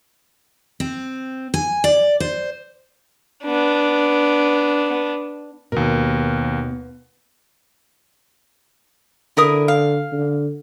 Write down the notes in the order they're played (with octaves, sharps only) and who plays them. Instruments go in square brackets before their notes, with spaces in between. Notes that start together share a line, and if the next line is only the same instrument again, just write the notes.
[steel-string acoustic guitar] C4
G#5
D5
C5
[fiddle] B3 D4
[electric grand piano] D#2 A#4 [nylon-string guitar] B2
[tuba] D3 [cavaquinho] E4 A#4 D#6
[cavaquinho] F5
[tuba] D3